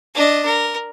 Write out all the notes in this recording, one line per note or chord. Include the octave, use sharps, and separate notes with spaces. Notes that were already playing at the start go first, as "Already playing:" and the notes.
D4 D#5
A#4